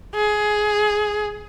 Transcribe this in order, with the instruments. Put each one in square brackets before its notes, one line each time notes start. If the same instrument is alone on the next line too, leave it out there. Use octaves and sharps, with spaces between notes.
[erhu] G#4